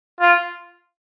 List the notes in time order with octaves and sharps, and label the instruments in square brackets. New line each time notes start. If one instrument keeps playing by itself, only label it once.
[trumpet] F4